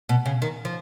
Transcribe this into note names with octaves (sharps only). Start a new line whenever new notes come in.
B2
C#3
D#3
F3